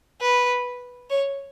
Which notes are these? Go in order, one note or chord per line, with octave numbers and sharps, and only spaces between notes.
B4
C#5